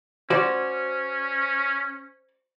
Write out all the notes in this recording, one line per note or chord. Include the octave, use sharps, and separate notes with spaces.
C#4 F#4 C5 D5